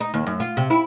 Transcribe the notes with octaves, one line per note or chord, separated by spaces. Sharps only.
D#4
D#2
F#2
F4
C3
E4